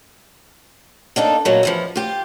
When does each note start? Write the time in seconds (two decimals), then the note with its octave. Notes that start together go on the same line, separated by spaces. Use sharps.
1.16 A#3 D4 D#4 A4
1.45 G2 A#2 F#3 G#3 A#3
1.63 E2 E3 F3
1.96 F4 G4